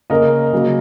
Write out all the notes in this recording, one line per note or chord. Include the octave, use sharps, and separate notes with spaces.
C#3 A#3 C#4 A#4 D#5
C#3 F#3 A#3